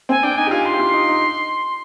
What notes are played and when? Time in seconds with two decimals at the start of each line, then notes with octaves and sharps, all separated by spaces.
0.09 C4 G#5
0.23 D4 G5
0.38 D#4 G#5
0.46 G4
0.51 F4 G#5
0.65 C6
0.74 G4
0.80 F4
0.93 D#4
1.08 D#4